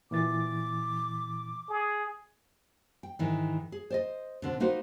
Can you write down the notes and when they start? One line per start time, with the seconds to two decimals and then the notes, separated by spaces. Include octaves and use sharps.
0.11 A#2 E3 D6 A6
1.70 G#4
3.03 G5
3.19 G#2 D#3 E3
3.72 G#4
3.90 C5 D5 D#5
4.42 B2 D3 C4
4.60 A#3 D#4 F#4 B4 C5